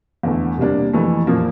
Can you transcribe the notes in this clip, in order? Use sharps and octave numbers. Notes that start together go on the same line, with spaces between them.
E2 D3 A3
C3 G3 A#3 D4
F2 E3 A3
A#2 F3 A#3